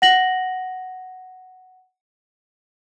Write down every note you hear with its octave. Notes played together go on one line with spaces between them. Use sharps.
F#5 A#6 F#7